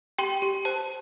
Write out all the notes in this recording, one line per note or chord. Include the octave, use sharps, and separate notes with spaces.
G4 G5 C6
G4
C5 A5